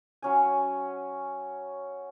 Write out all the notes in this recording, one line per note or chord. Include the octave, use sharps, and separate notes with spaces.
F#3 C#4 G#5